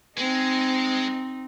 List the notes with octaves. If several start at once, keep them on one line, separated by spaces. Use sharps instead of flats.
G#3 C4 D#4